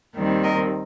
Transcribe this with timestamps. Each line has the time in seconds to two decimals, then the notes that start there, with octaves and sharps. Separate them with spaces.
0.15 D#2 D#3 G3 C4
0.43 A#4 D#5